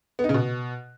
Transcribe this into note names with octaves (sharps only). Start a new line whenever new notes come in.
B3
D#4
C#3
B2